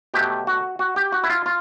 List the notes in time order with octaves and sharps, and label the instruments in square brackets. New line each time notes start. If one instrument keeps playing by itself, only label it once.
[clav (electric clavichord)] B2 F#3 A3 G4
F#4
F#4
G4
F#4
E4
F4
F4